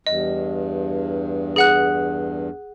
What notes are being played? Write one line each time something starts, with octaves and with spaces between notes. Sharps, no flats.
E2 G2 D#5
G#4 F#5 F#6